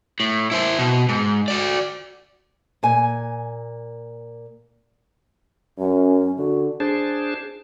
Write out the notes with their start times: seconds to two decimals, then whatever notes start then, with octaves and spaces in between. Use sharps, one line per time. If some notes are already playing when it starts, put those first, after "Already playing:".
0.20 A2
0.51 E4 C5
0.79 B2
1.09 G#2
1.48 F#4 D5
2.83 A#2 G#5
5.79 F#2 C#4
6.38 D3 F#4
6.80 D4 G#4 C5 A5